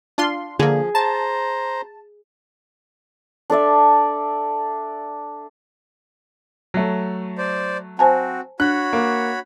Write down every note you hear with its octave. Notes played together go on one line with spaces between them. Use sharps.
D4 F4 C6
D3 F3 A#3 G#4
C5 A5 A#5
D4 A4 D5 E5
F#3 A3
C5 D5
C4 F#4 C5 G#5 A5
D4 F#4 C#5 B5 F#6
A#3